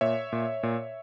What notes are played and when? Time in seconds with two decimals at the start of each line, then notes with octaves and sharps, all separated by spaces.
0.01 A#2 C#5 E5
0.33 A#2
0.63 A#2